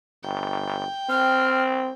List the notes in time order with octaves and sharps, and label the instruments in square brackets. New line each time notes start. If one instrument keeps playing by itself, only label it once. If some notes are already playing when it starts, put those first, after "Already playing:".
[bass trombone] G1 [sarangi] G5
[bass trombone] C4 [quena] F6